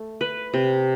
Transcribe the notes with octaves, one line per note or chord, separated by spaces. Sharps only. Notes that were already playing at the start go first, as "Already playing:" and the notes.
Already playing: A3
B4
C3